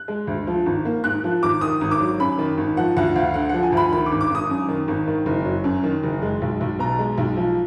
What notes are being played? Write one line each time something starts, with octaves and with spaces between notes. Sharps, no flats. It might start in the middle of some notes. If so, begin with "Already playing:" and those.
Already playing: F#6
G#3
D2
F3
G#1
A#3
G#2 F#6
F3
G#1 D6
D#3 D#6
G#1
D6
F#3
F#2 B5
D#3
G#1
F3 F#5
D2 F#5
D2 F5
D3 F#5
F3 F#5
G#5
D2 B5
D#3 B5
D6
G#1
D6
G#1 D#6
F#2
D#3
G#1
D#3
F#1
F#3
F#2
D#3
F#1
G#3
B1
B1
B2 A#5
G#3
B1
F3